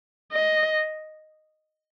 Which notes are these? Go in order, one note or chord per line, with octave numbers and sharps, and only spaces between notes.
D#5